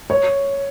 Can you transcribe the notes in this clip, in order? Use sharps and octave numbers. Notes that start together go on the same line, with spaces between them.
C#5